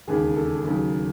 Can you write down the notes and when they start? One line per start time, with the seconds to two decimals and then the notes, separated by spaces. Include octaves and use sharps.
0.08 E1 D#2 C#3 G#4
0.36 A4
0.65 D#2 C#3 F#3